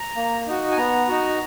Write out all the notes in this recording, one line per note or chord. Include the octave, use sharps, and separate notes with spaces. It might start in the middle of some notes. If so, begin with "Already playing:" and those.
Already playing: A#5
A#3
D#4 F#4
G#5
B3 A#5
D#4 F#4